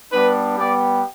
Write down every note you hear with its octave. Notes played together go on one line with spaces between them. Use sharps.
G3 B3 D4 B4
G3 B3 G4 D5